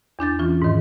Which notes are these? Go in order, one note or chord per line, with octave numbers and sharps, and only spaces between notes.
E2 D4 G6 A6
E3 C#4 F4
G#2 D#3